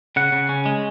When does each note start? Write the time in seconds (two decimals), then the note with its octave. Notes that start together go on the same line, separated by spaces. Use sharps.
0.16 C#3 F#5
0.32 C#3
0.49 C#4
0.66 G#3